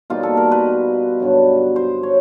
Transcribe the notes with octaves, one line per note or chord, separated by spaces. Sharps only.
B2 G3 A#3 D#4 F4
A4
A#4
B4
G2 D3 F#3
C5
C#5